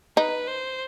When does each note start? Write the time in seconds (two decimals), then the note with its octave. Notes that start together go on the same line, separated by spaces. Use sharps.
0.16 D#4 B4
0.48 C5